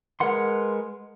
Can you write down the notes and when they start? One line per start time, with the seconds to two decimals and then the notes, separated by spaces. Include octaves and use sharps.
0.20 G#3 A#4 B4 F#5 C6